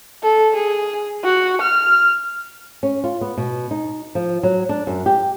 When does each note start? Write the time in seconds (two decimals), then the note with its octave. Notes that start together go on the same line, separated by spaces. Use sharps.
0.23 A4
0.56 G#4
1.24 F#4
1.61 F6
2.83 C#4
3.04 F4
3.21 B3
3.37 B2
3.71 D#4
4.15 F3
4.43 F#3
4.69 D4
4.87 F#2
5.06 G4